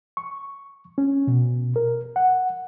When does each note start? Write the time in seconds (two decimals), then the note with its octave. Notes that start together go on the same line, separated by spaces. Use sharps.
0.17 C#6
0.98 C#4
1.27 B2
1.76 A#4
2.16 F#5